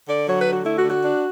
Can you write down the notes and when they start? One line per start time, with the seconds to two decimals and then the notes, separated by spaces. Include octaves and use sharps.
0.08 D3 D5
0.28 F#3 C#5
0.40 B4
0.46 D3
0.53 F#4
0.65 A3 E4
0.78 F#4
0.84 D3
0.90 F#4
1.03 D4